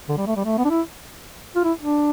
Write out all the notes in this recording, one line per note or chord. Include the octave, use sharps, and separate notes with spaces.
D3
G3
A3
G3
A3
B3
D4
E4
F4
E4
D4